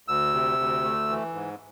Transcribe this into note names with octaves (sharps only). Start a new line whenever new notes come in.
D2 E6
C3
D2
A3
E3
G#2